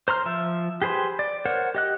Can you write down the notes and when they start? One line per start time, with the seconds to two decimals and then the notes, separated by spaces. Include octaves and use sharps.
0.08 C5 A#5 C6 F6
0.26 F3 E5
0.82 G4 G#4 B4 C5 C6
1.19 D5
1.45 A#4 C5 C#5 F#5
1.75 G4 D#5 F#6